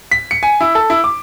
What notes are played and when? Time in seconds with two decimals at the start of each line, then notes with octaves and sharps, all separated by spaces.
0.11 B6
0.31 C#7
0.43 G#5
0.61 E4
0.75 A4
0.90 E4
1.04 D6